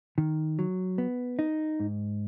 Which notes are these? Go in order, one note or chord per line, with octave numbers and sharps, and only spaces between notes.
D#3
F#3
B3
D#4
G#2